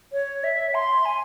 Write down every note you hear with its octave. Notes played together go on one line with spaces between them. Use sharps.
C#5
E5
C6
G#5